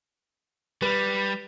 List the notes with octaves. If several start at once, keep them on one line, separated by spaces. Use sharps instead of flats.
G3 B4